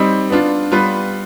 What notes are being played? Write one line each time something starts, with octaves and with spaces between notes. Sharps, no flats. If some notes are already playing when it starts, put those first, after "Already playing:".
Already playing: G3 C4 D#4
B3 D4 F4
G3 B3 F4 B4